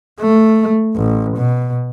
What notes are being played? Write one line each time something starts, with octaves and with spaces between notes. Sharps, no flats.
A3
A1
B2